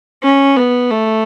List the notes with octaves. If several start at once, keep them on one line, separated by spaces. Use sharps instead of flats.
C#4
B3
A3